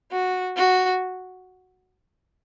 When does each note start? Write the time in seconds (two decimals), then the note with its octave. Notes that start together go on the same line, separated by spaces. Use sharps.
0.11 F#4
0.57 F#4